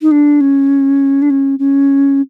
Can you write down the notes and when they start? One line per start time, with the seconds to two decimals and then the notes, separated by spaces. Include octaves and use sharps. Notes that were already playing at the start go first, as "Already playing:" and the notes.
0.02 D#4
0.11 D4
0.41 C#4
1.22 D4
1.30 C#4
1.59 C#4